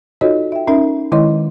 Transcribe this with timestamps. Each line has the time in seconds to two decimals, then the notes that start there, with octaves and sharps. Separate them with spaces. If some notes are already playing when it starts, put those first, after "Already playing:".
0.21 D#4 F4 F#4 A4 C#5 D#5
0.52 E5 G5
0.67 C#4 D#4 A#4 E5
1.12 D#3 G#3 E4 C#5 D#5 C6